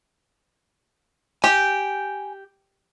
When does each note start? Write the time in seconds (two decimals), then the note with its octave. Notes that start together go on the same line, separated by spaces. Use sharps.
1.44 G4 G#5